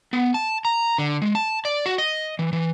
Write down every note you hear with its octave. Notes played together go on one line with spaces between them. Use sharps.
B3
A5
A#5
D3
G#3
A5
D5
F#4
D#5
E3
E3